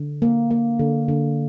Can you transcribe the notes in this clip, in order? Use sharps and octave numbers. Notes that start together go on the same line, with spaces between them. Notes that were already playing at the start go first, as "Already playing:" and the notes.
Already playing: D3
A#3
A#3
D3
D3